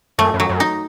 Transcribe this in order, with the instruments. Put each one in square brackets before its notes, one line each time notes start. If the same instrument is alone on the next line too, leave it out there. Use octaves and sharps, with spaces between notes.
[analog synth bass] F#2 [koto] A3
[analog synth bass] F#2
[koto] F#3
[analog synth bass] F#2
[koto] D#4